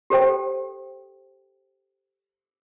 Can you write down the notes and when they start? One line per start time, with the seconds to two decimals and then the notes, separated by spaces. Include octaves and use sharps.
0.10 G4 A4 C5 G5